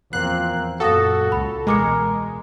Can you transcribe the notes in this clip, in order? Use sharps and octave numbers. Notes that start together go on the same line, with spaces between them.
E2 F3 A#3 C4 F#6 C7
F#2 A#2 F#4 A4 F5 D#6 A#6
C#2 B5
E2 B2 G#3 A#4 G#5 D6 C#7